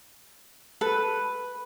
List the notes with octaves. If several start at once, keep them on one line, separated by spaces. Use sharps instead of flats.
A4 B4